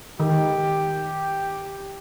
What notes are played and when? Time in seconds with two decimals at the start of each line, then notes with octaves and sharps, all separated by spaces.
0.20 D#3 G4